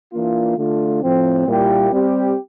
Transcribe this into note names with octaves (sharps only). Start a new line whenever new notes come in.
E3 A#3 D4 F4
D3 A3 D4 F4
A2 F3 C4
A#2 G3 A#3 E4 G4
G3 C4 G4